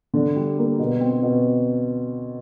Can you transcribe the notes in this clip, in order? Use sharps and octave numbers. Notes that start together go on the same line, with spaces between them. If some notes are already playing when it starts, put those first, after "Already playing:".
D3
G3
A#3
B2
C4
B2